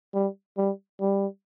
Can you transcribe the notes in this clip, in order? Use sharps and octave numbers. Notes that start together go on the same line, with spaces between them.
G3
G3
G3